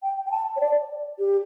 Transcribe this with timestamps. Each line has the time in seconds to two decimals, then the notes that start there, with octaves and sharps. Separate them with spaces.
0.03 G5
0.26 G5
0.32 A5
0.56 C#5
0.60 D5
1.19 G4